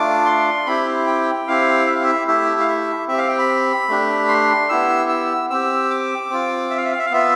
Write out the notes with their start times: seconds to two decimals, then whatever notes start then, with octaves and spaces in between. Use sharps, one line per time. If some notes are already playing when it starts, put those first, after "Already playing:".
Already playing: A3 D4 F4 D6
0.26 C6
0.66 C4 E4 G4 B5
1.07 G5
1.48 C4 E4 G4 F5
1.87 E5
1.95 F5
2.03 E5
2.28 A3 E4 G4 E5
2.60 F5
2.68 E5
3.07 C4 G4 E5
3.18 F5
3.28 G5
3.38 B5
3.89 A3 D4 G4
4.28 C6
4.69 B3 E4 G4 E6
5.09 E6
5.50 C4 G4 E6
5.90 D6
6.30 C4 F4
6.70 E5
6.77 F5
6.85 E5
6.92 F5
6.99 E5
7.06 F5
7.11 B3 F4 E5